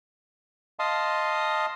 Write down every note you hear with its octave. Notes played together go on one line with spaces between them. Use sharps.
D#5 F5 A5 C6 D#6